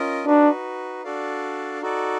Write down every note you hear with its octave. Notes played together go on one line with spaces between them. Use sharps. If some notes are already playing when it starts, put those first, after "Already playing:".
Already playing: C#4 F4 A#4 D#5
D4 D#4 F#4 B4
D4 F#4 A4 D5 F5
D#4 F#4 A4 D5